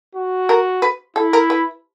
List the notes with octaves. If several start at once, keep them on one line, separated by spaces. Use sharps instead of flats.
F#4
A#4
B4
E4 A4
A#4
B4